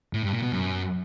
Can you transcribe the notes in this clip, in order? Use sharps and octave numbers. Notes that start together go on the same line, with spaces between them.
A2
G2
A#2
B2
F#2